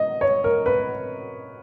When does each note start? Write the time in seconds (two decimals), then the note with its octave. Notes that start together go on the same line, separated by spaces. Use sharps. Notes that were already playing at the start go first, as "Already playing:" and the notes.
Already playing: D#5
0.21 C#5
0.44 A#4
0.66 B4